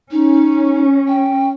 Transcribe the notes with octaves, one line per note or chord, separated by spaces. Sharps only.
C#4 D#4
G5